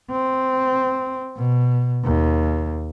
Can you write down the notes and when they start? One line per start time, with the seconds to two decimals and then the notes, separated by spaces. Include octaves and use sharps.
0.11 C4
1.37 B2
2.04 D#2